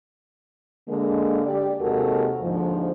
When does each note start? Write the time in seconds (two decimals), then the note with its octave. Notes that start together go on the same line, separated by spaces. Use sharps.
0.89 D3 G#3 A#3
1.46 G4 D5
1.81 D#2 C3 G#3 F#4 A4 A#4
2.42 D#2 G#2 D3 F3